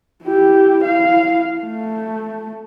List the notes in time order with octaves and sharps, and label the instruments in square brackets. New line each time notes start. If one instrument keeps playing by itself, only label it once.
[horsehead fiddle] E4 G4
E4 F5
A3